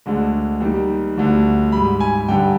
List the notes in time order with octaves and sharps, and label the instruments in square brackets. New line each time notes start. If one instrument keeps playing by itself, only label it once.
[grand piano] D2 D3 G#3
D#2 D#3 G3
D2 D3 G3
G#2 G3 B5
G#5
G2 D3 G3 G5